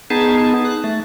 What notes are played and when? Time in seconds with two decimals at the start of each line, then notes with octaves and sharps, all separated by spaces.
0.10 B3 D#4 G#4 A5
0.65 F#6
0.84 A3